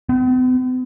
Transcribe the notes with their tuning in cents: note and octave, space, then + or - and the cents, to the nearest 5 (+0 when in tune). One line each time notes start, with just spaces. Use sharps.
B3 +45